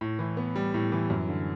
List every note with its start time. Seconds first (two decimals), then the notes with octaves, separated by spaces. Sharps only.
0.01 A2
0.19 E3
0.37 B3
0.56 G3
0.74 A2
0.92 E3
1.10 F#2
1.28 D3